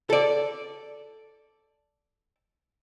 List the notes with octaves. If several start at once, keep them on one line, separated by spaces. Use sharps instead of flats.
A4 D5